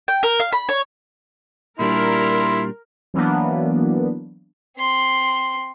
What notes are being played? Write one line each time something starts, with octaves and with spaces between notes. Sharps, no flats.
G5
A#4
F5
B5
C#5
A#2 G3 D4 E4 A#4 C6
E3 F#3 A#3 B3 D4
C4 C6